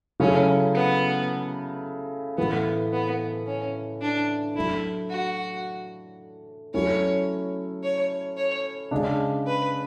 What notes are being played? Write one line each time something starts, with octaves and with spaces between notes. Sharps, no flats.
C#3 F#3 A3 C#4 E4
B3
A2 E3 A3 B3
B3
C#4
D4
F#3 A3 D4 E4
F#4
F#3 A3 C#4 E4 C#5
C#5
C#5
C#3 G#3 D4
B4